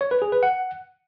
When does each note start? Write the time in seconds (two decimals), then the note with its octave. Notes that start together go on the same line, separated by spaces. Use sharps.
0.01 C#5
0.11 B4
0.22 G#4
0.32 B4
0.43 F#5